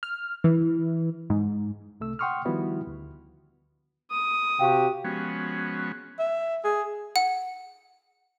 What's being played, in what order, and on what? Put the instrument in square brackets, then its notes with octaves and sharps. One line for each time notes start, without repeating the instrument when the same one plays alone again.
[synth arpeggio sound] F6
E3
G#2
[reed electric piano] C2 C3 A3 E6
F#5 G5 C6 C#6 D#6 F6
D#3 F3 G3 B3 E4 F#4
D2
[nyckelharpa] D#6
[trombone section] C3 F#4 G4 [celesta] F5 G5
[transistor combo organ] F3 G#3 B3 C#4 F#4
[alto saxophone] E5
G#4
[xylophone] F#5